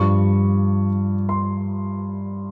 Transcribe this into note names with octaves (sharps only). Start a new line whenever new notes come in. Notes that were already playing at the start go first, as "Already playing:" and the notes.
Already playing: G2 F3 C#6
C6